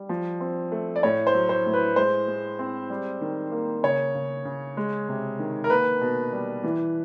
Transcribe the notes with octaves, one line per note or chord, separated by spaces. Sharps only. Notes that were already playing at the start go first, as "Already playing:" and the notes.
Already playing: G3
F3
C4
A3
D5
A2 C#5
C5
F#3
C5
A2
B4
G#3 C5
G#3
C4
G3
D#3
A#3
C#3 C#5
C#3
C#3
G#3
C3
D#3
A#4
A#3 B4
B2
G3
E3